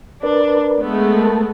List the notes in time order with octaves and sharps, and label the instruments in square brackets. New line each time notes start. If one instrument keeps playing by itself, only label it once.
[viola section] D4 [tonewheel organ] A#4 B4 D5
[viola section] G#3 A3 B3
[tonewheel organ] A#4 A5